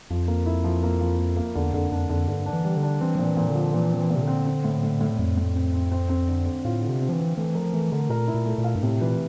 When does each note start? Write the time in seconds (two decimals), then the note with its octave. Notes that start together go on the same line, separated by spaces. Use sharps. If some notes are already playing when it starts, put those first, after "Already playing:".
0.10 F2 F3
0.28 A#3
0.46 E4
0.64 F3
0.83 A#3
1.01 F3
1.19 A#3
1.37 A#3
1.55 E2 D3
1.73 F2 D3
1.91 F2 D4
2.10 F2 D3
2.28 G2 D3
2.46 D4
2.53 E3
2.65 G3
2.77 D3
2.83 D4
3.01 E3 C4
3.16 A#2 F3
3.25 E3
3.37 A#2
3.50 D3
3.55 F3
3.73 A#2 E3
3.92 C4
3.98 E3
4.10 A#2
4.15 C3
4.22 D3
4.27 C4
4.46 C4
4.64 A2
4.83 A2
5.01 A2
5.19 F2 A2
5.37 A2
5.56 C4
5.74 C4
5.92 C4
6.09 C4
6.28 D3
6.46 C4
6.65 A2 F4
6.82 D3
6.89 C3
7.01 C4
7.09 F3
7.12 E3
7.20 C4
7.37 E3 A3
7.55 F3 A#4
7.73 E3 A3
7.92 D3 A#4
8.09 A#2 A#4
8.27 E4
8.34 A#2
8.46 A3
8.58 A#2
8.64 F5
8.75 G2
8.83 A2 C3
9.00 A#2 E3